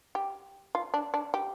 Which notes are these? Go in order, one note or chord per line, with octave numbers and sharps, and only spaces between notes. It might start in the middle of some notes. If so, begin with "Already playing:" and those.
G4
F4
D4
D4
G4